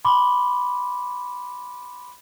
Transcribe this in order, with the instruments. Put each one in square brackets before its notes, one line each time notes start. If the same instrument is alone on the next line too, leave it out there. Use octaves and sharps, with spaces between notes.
[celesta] B5 C6 D6